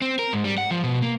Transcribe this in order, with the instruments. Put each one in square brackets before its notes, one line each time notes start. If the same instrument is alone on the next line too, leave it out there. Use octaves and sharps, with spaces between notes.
[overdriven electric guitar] C4
A#4
G#2
G3
F#5
F3
B2
A#3